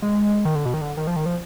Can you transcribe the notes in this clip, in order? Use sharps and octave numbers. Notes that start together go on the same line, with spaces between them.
G#3
D#3
D3
B2
D#3
D3
D#3
F3
D#3
F3